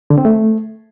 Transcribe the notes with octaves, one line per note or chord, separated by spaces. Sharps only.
D3
C4
A3